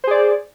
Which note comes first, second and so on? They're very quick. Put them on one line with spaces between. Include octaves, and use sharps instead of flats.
C5 G#4 D5